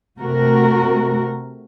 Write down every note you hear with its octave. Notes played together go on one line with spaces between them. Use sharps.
C3 A3 F#4 A#4